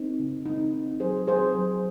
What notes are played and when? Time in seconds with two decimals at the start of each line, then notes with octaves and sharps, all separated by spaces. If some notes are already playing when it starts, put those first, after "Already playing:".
Already playing: C4 D#4
0.19 C#3
0.46 C4 D#4
0.74 C4
1.00 F#3 G#4 C5
1.27 C4 G#4 C5
1.55 F#3